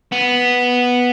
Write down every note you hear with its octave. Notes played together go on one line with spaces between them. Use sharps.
B3